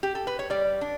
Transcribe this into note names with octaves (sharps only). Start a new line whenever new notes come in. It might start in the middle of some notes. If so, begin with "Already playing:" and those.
G4
A4
B4
C#5
G3 D5
D4